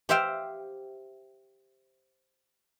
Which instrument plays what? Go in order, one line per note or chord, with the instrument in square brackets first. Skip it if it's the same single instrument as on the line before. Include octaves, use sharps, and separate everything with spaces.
[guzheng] G4 C5 E5 F5 G5